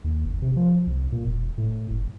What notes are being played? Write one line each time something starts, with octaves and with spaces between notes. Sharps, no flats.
D#2
G1
C3
F3
C2
A#2
E1
A2
F#1